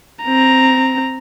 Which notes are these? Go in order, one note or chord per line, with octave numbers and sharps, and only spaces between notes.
C4 A#5